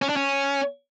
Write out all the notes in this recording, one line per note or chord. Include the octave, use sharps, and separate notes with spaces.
C#4
D4
C#4